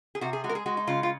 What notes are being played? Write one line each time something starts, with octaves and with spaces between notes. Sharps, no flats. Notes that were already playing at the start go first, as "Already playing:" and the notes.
G#4
C3 F#4
G#4
G#3 F#4
A#4
G#4
G#3 F#4
D#4
C#3 F4
F4